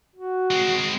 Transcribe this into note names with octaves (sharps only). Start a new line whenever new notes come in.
F#4
G#3 C4